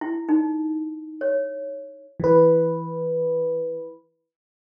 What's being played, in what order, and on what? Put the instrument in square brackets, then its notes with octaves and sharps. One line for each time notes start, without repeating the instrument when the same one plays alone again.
[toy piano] E4
D#4
C#5
[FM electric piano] E3 B4